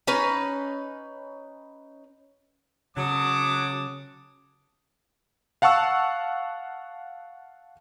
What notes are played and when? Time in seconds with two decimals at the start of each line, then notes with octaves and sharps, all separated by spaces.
0.07 C#4 D#4 B4
2.97 C#3 F#3 A5 D6 D#6
5.62 F5 F#5 A5 C#6 E6